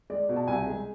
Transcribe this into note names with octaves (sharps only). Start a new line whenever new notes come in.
G#3 D5
B2
A5
C2 G#5
G#3